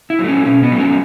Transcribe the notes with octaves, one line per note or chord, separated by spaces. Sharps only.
E4
F#3
A3 C#4
B2 C#4
B3
F#3 A3
C#4